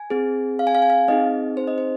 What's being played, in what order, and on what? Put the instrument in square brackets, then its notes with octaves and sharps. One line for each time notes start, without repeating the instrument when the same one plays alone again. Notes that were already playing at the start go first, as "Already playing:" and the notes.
Already playing: [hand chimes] G#5
C4 G#4
F5
G#5
F5
G#5
F5
C4 D#4 G#4 D#5
C5
D#5
C5